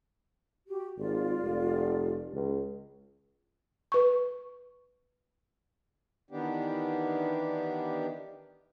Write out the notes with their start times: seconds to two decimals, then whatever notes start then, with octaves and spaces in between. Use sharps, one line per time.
0.68 F#4 G4
0.98 G#1 F4 D5
1.41 F1
2.33 C#2
3.92 B4 C#6
6.31 D#3 E3 B3 D4 G4